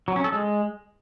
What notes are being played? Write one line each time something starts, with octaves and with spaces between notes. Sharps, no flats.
F#3
C#4
A4
G#3